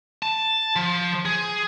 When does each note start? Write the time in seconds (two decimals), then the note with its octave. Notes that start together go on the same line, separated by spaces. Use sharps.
0.22 A5
0.76 F3
1.25 G#4